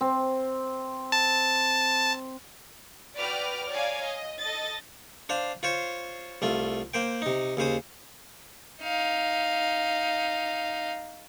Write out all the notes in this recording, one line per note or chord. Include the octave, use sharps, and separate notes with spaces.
C4
A5
F#4 B4 D5 G5 D6 F6
C#5 D5 F5 G#5 A#5
D#5
A4 D#5 A6
D4 C5 F5
F4 C5 C#5
C2 A3 F4
A#3 C5 G5
C3 D#4
D#2 C#3 C5 D#6
D#4 F5